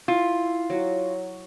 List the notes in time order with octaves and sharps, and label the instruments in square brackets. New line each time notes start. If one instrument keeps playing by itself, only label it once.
[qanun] E4 [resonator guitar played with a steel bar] F4
[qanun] F#3